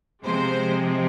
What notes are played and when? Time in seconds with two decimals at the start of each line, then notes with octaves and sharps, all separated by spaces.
0.24 C3 F3 G#3 C5